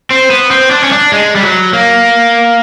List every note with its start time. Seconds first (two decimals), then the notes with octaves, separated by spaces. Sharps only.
0.11 C4
0.30 B3
0.51 C4
0.71 D4
0.83 C#4
0.92 D4
1.12 G#3
1.35 G3
1.43 F#3
1.73 A#3